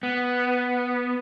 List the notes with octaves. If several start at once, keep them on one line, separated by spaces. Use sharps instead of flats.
B3